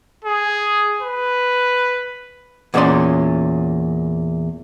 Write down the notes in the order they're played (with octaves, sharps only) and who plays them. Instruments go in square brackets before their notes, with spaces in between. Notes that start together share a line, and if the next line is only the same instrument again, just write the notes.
[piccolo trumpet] G#4
B4
[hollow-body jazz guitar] E2 A#2 C4 C#4 D5 C6